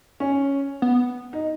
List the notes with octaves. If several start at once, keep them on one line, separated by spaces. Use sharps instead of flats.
C#4
B3
D#4